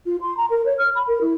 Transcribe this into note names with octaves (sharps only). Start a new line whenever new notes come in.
F4
C6
A#5
A#4
C#5
F6
B5
A#4
E4